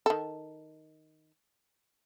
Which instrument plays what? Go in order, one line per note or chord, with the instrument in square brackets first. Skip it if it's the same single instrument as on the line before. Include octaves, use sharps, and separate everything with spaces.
[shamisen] D#3 A4